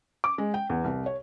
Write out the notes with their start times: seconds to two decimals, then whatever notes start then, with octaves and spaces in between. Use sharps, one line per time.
0.24 D6
0.38 G#3
0.54 G5
0.70 E2
0.84 C2
1.06 C#5